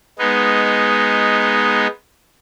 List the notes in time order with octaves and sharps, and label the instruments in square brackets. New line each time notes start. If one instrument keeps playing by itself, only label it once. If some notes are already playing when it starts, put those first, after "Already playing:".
[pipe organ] G#3 B3 D#4